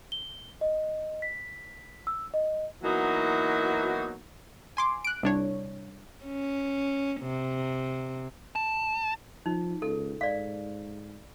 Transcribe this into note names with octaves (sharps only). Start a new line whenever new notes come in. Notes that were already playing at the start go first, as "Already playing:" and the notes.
G7
D#5
B6
E6
D#5
E3 F#3 A#3 B3 D#4 F#4
G#5 C6 D6
F#6 D7
C2 D4 C#5
C#4
C3
A5
F3 D#4
C#2 A4
G#2 D5 F5